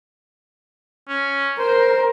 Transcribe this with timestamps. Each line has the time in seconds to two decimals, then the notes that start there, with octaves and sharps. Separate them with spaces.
1.09 C#4
1.59 A#4 C5